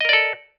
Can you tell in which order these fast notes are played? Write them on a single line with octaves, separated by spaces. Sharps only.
D#5 A#4 D5 A4